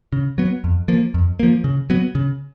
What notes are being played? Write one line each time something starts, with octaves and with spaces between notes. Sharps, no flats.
C#3
F#3 B3
F2
F3 A#3
F2
F3 A#3
C#3
F#3 B3
C#3